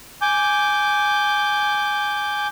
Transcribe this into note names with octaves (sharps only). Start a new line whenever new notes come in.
G#5 D6 G6